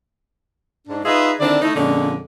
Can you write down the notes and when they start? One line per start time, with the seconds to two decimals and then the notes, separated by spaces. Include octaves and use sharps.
0.88 G#2 D4
1.05 D#4 F4 G#4 B4 D#5 E5
1.39 D3 D#3 C4 D4 E4 D5
1.62 A3 D#4 E4
1.75 F2 A#2 D3 G#3 C#4